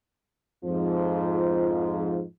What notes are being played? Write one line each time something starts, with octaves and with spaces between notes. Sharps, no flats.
F2 G#2 F3